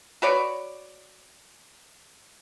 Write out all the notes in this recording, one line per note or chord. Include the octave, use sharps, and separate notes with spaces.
F#4 B4 C#5 D5